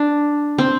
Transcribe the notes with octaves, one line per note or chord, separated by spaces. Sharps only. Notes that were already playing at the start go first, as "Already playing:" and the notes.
Already playing: D4
C4